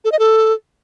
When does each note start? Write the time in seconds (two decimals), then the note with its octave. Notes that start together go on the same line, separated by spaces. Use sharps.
0.05 A4
0.12 D#5
0.19 A4